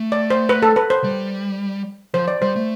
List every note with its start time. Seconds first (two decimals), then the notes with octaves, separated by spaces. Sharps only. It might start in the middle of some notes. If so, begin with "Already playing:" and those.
Already playing: A3
0.12 D5
0.31 C5
0.49 B4
0.62 A4
0.76 B4
0.90 C5
1.04 G3
2.14 F3 C5
2.28 D5
2.42 G3 C5
2.56 A3